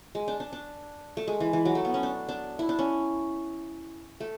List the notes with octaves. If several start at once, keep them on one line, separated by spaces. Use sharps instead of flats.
G#3
D4
D4
D4
A3
G#3
E3
E3
F#3
A3
B3
C#4
D4
D4
E4
D4
C#4
A3